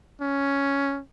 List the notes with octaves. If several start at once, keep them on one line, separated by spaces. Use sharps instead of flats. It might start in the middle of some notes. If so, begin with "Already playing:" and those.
C#4